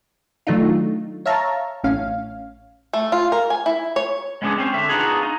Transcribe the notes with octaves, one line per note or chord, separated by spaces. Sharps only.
D#3 F#3 A3 D4 D#4 F4
C#5 E5 F5 A5 A#5
A1 A2 C#4 F5
A3
F4
A#4
G#5
E4
C#5
G#3 B3 C#4 D4 G#4
C4 C#4 C5
D3 E5
B3 D4 D#4 F4 F#4 G#4
D#4